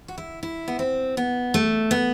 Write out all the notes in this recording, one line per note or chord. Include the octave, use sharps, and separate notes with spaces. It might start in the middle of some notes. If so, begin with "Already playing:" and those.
F#4
E4
E4
B3
C4
B3
A3
B3